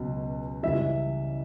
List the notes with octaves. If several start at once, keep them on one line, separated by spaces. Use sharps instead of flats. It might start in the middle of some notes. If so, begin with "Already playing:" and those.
Already playing: C#2 B2 F#3
C#2 C#3 E3 G3 E5